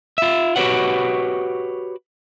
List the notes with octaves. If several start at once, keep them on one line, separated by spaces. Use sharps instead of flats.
F4 E5
F#4 G4 A#4 B4 C#5 F#5